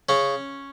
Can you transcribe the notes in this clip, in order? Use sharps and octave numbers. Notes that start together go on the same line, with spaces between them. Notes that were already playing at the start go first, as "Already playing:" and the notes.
C#3 C#4